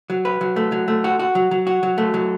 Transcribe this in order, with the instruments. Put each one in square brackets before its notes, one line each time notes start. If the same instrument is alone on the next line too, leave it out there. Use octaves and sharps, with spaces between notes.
[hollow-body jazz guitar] F#3
B4
F#3
A3
F#3
A3
F#4
F#4
F#3
F#3
F#4
F#3
A3
F#3